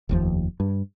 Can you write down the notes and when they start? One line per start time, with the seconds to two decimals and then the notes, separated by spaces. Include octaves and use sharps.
0.09 F1 D#2 F3
0.60 G2